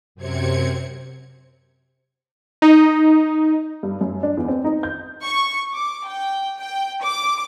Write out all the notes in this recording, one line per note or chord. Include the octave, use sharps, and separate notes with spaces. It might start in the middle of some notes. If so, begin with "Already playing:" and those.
F#2 C3 C4 G#6 C#7
D#4
G2
F#2
D4
E2
C4
D#4
G6
C#6
D6
G5
G5
D6